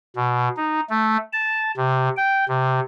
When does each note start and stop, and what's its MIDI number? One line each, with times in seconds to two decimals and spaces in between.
0.16 0.49 47
0.57 0.80 63
0.90 1.17 57
1.33 1.71 81
1.77 2.09 48
2.17 2.45 79
2.49 2.80 48